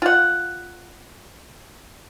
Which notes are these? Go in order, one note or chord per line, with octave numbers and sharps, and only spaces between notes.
F4 F#5